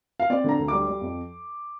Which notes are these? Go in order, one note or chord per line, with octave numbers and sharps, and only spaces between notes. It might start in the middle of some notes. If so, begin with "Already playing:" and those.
F5
C4 D5
D3 A#5
D2
G3 D6
G3
F2